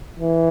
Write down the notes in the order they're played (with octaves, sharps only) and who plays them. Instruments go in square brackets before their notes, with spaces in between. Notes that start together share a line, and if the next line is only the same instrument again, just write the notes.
[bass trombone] E3